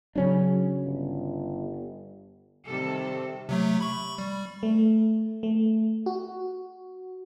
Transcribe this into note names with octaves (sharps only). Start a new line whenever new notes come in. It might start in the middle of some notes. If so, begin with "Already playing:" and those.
C#3 F#3 C#4 D4
G1
C3 D#3 G3 A4
C3 F#3 A3
B5 C#6
G3
A3
A3
F#4